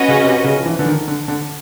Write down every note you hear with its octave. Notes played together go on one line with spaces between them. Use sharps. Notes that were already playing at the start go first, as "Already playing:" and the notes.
Already playing: C#4 F#4 B4 D#5
C#3
C3
C#3
F3
E3
D3
D#3
D3
D3